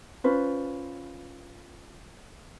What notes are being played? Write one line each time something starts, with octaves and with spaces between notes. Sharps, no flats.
C#4 F4 B4 C5